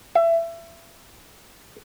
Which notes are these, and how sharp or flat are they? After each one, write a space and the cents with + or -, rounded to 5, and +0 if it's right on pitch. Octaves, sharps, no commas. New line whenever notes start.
E5 +25